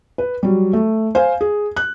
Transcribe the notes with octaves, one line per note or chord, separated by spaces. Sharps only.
B4
F#3 G3
A3
C5 F5 G#5
G#4
F#6